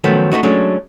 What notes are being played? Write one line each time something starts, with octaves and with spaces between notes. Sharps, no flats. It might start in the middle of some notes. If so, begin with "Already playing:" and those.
D#3 F3 F#3 A3 B3 C#4
A3 C4 D#4 F#4
F#3 G#3 A3 C#4 D4